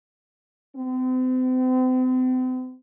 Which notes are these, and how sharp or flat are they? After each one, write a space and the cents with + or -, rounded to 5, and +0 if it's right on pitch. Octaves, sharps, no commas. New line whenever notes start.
C4 -40